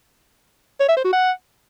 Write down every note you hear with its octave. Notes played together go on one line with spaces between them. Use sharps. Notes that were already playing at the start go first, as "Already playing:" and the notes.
C#5
E5
C5
F#4
F#5